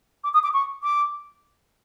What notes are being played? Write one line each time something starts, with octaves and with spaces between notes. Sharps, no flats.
D6
D#6
D6
C#6
D6